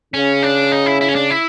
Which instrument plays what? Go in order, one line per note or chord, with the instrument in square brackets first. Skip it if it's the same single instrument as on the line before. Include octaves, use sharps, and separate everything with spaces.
[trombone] C#3 [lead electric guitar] C#4
[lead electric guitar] D4
D#4
E4
E4
C#4
D4
E4